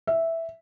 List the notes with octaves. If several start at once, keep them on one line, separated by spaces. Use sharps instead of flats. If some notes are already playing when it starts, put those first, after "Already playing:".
E5